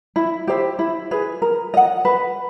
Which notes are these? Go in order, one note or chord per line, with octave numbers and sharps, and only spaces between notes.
E4
G4 C5 E5
E4
G#4 B4
A#4
D#5 F#5
B4